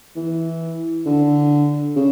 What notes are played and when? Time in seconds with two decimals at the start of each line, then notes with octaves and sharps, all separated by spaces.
0.16 E3
1.06 D3
1.96 C#3